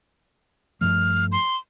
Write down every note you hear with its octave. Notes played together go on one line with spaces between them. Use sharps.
G2 F3 A3 F6
C6